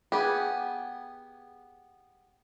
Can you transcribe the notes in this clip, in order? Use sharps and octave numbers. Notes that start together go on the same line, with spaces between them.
B3 G4 G#4